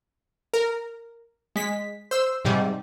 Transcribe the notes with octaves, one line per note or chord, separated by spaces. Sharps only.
A#4
G#3 B6
C5 E6
G#2 C3 G3